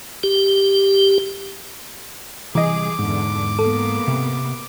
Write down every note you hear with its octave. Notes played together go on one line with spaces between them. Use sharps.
G4
C2 E3 G#4 D#5 D6
E2 G#2 D3
A#3 B3 A4
C3